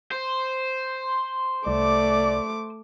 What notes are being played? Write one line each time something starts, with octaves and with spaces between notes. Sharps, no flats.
C5
C2 A3 D5 D6